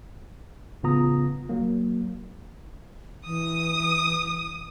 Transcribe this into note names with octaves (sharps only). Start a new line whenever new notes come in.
A1 C#3 B3 F4 A#5 D#6
F#3 A#3
E3 D#6